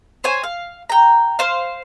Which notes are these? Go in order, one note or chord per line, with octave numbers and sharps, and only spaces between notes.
C5 C#5 G#5
F5
G5 A#5
C5 F5